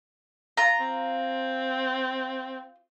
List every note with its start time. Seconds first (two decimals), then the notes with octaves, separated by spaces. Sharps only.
0.57 F4 A#5
0.80 C4